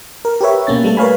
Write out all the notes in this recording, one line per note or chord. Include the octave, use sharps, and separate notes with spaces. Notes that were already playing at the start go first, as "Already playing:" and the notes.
A#4
G4 A#4 B4 C#5 E5
B2 A#3 C#4 A6
G3 A3 A4
A#4 B4 C#5 F5 G#5 B5